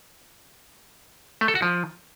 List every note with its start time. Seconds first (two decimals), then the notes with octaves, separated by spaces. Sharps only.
1.41 A3
1.48 A4
1.55 F#4
1.62 F3